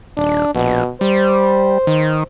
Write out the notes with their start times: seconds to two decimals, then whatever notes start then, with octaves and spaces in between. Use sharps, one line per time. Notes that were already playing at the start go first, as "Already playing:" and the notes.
0.17 D#1 D4
0.55 A#1 B2
1.01 G3 C5
1.87 D#3